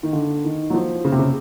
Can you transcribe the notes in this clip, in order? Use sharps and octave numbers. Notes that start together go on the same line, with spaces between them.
D#3
D3
D#3
F#3
F3
C#3
C3
C#3